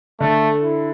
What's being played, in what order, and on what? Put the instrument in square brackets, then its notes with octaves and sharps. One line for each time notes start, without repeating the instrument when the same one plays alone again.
[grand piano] D3 [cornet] A3
[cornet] E4